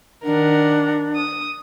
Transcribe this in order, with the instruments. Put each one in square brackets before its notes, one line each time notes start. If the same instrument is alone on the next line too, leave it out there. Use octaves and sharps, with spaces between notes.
[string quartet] D#3 A#4 F#5 [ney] D4
[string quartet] D#6